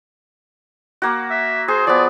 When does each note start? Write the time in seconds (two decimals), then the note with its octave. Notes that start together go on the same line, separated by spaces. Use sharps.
1.02 A#3 F#4
1.30 E5
1.68 G#4 C5
1.87 F3 B3 D5